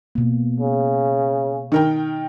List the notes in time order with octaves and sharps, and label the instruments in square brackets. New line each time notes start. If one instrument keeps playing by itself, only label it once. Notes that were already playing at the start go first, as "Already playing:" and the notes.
[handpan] B2 A#3
[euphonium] C#3
[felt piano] D#3 A#4 G5